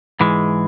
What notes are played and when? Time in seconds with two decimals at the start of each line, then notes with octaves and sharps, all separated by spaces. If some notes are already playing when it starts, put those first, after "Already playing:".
0.20 G#2 E3 G#3